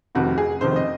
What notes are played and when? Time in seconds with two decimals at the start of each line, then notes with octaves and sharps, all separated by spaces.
0.15 F1 F2 C3 D#3 F#4
0.38 G#4
0.61 F1 F2 C3 D#3 C5
0.76 D#5